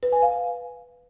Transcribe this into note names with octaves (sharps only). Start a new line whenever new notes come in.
B4
G#5
F5